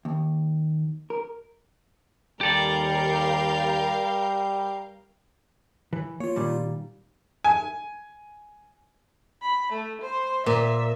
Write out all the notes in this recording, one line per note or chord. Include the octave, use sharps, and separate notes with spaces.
D#2
A#4
D#2 G3 G4 A4 A#4 D5 F5 G6
E3
A#3 F4 C#5
A#2 D#3 G3
G#5
B5
A3
C5
A#2 E5